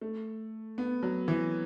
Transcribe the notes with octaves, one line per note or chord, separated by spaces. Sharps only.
A3
B3
F#3
E3